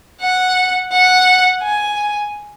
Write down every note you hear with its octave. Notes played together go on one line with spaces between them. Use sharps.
F#5
F#5
G#5